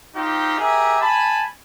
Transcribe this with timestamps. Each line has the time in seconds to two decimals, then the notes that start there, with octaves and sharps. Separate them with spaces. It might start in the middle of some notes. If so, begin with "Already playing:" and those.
0.15 C4 D#4 F4 G4
0.59 G4 G#4 A#4 E5
1.02 G#5 A5 B5